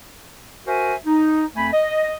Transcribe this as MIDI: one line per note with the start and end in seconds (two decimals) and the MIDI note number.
0.66 0.94 66
0.66 0.94 70
0.66 0.94 72
0.66 0.94 76
0.66 0.94 80
1.06 1.44 63
1.56 1.69 41
1.56 1.69 57
1.56 1.69 80
1.56 1.69 83
1.72 2.17 75